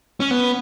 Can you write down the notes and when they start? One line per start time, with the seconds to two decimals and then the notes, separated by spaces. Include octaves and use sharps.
0.20 C#4
0.31 B3